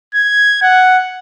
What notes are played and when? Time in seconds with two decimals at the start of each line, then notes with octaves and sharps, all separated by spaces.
0.15 G#6
0.62 F#5